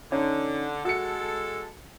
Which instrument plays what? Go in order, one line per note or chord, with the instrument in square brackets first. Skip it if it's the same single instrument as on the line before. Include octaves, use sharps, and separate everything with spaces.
[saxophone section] D3 [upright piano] C#4 D#4
[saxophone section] G#3 A4 [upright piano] F#4 C#7